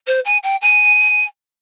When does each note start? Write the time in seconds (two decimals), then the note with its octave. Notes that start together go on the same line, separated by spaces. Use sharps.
0.07 C5
0.25 G#5
0.43 G5
0.61 G#5